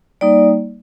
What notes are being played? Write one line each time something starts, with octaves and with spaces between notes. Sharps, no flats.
G3 A#3 D#4 D5